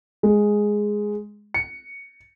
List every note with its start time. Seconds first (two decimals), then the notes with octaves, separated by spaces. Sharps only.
0.23 G#3
1.54 C#7